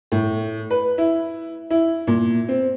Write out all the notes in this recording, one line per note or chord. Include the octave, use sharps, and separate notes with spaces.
A2
B4
E4
E4
A#2
C4